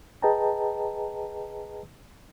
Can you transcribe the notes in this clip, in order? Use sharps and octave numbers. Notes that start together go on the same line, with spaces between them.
G#4 B4 D#5 G5 A5 A#5